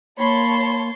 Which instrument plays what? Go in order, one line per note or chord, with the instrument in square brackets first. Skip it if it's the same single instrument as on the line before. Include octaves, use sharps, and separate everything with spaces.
[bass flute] A#3 [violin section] C#5 A5 C6 [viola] B5